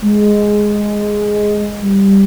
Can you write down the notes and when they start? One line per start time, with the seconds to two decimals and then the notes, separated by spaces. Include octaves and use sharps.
0.02 G#3
1.82 G3